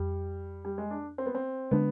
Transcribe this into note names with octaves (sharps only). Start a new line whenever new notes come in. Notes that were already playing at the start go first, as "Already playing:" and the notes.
Already playing: F2 G3
G3
G#3
D4
C4
B3
C4
D3 G#3 B3 D4